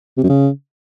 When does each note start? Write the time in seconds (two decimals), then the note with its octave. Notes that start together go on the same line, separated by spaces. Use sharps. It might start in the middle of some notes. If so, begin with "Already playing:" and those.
0.18 C3
0.23 F#2
0.29 C#3